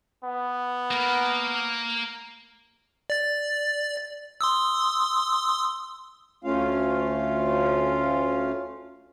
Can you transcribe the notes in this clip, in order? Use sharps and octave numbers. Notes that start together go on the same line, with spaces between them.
B3
A#3 A#4
D5 A6
C6 D#6 E6
D2 A3 C#4 F4 F5